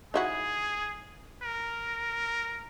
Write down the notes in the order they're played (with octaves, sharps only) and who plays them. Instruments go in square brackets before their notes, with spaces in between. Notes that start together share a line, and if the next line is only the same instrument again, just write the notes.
[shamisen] D#4 E4 F#4 [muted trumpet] G#4
[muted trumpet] A#4